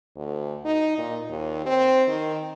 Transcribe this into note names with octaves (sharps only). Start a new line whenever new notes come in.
D2
D#4
A#2
D#2
C4
D#3